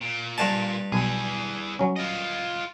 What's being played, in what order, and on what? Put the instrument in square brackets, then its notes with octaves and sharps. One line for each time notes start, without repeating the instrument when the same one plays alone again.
[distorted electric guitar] A#2
[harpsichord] G2 A5
[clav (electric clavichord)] B1 [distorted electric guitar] E3 G#4
[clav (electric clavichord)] F#3 C#4
[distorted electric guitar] F4 D#5